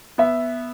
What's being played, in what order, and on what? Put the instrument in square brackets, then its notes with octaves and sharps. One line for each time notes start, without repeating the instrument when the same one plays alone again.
[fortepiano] B3 [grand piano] E5